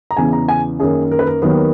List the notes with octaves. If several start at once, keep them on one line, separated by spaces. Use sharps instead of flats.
A#5
E2 C#3 E3 G#5
A#5
G#5
F#2 D#3 A#3 G#4
A#4
B4
A#4
D#2 D#3 F#3 A#3 B3